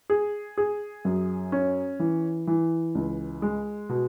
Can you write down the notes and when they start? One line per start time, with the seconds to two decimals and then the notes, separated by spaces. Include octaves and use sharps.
0.10 G#4
0.58 G#4
1.05 F#2
1.52 C#4
2.00 E3
2.47 E3
2.95 C#2
3.42 G#3
3.89 B2